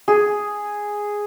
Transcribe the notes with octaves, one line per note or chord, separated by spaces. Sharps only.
G#4